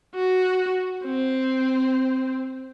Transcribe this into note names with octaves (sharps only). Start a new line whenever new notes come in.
F#4
C4